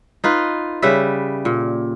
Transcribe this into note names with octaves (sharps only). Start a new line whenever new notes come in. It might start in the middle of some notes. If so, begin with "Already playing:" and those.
D#4 F4 B4
C#3 G3 B4 E5
A#2